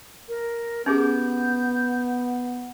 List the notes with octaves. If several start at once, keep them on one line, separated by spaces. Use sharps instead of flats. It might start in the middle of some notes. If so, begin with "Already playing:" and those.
A#4
B3 C#4 G4 G#4 G6